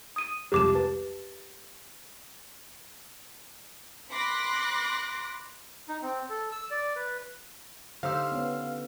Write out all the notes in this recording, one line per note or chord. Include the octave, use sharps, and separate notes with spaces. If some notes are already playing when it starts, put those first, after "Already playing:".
D#6 D#7
C2 F2 G#3 G4 D6 E7
B4 A5
B5 C6 D6 F#6 A#6
D#4
C4
A4
E6
D5
B4
D3 C4 D#4 G4 F5 E6
B3 C#4